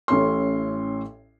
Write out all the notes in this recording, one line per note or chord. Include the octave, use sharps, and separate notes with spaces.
A1 A2 C#4 E4 C#5 C6